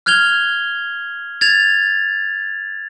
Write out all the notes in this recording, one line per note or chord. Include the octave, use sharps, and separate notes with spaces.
F6 F#6 G#6 F7 G7
G#6 A6 F7